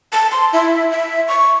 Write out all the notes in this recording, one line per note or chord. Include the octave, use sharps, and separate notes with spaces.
A5
C6
E4
E5
C#6